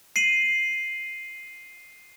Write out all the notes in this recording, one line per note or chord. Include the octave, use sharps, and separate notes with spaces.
C7 D#7 F#7